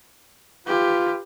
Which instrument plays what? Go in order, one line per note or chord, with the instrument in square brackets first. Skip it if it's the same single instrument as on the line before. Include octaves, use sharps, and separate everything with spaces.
[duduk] F4 [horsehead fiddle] G4 B4